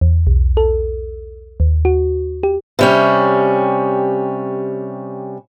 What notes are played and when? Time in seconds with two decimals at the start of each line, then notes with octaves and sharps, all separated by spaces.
0.01 E2
0.27 B1
0.57 A4
1.60 D#2
1.85 F#4
2.43 G4
2.79 C3 G3 C#4